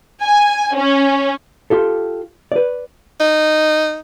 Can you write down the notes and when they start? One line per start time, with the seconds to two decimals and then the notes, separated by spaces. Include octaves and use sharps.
0.22 G#5
0.76 C#4
1.70 F4 G4 A4
2.52 B4 D5
3.20 D#4